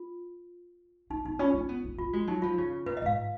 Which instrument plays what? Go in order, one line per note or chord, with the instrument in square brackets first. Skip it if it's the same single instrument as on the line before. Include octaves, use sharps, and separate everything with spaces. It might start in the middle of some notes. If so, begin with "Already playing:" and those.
Already playing: [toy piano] F4
[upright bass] A#3 [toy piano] D#4
[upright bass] B3 [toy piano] D#4
[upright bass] C#4 [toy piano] F4
[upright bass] C#4
B3
B3
[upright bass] B3 [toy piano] F4
[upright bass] G#3 [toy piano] F#4
[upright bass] F#3 [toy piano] D#4
[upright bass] F3 [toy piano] F4
[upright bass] C#3
[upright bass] A#2 [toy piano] B4
[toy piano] D#5
[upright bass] G#2 [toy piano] F5